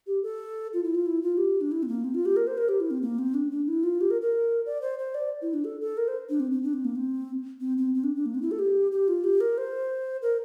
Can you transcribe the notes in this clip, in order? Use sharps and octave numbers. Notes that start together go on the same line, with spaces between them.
G4
A4
F4
E4
F4
E4
F4
G4
D4
E4
C4
A#3
C4
F4
G4
A#4
C5
A#4
G4
E4
C4
A#3
C4
D4
D4
E4
F4
G4
A#4
A#4
D5
C5
C5
D5
E4
D4
A4
A4
A#4
C5
D4
C4
C4
D4
C4
A#3
C4
C4
C4
C4
D4
D4
A#3
C4
E4
A4
G4
G4
F4
G4
A#4
C5
A#4